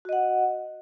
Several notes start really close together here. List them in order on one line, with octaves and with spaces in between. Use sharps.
F#4 D#5 F#5